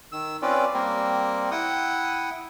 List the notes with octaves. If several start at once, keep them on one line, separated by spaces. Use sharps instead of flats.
D#3 E6
C4 C#4 F4 B4 D5
G3 A#3 C4 A#4
E4 F#5 G5 D#6